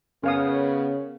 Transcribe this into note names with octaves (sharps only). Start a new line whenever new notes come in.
C#3 B3 C#4 A#4 C#5 F5 D#6